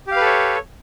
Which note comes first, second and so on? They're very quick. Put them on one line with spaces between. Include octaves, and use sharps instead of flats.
G4 F5 B4 A4 C#5